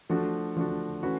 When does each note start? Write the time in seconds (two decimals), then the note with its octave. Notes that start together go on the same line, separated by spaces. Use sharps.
0.09 F3 A3 D4 F#4
0.56 F3 A3 D4 F#4
1.02 E3 A3 C#4 F#4 B4